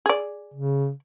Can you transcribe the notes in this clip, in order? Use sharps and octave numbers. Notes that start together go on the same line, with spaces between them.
G#4 D5
C#3